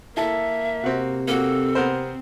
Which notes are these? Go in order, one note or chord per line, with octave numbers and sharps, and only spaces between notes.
A#3 E4 A4 E5
C3 C4 F#4
A#3 C4 F#4 A4
B3 A#4 C5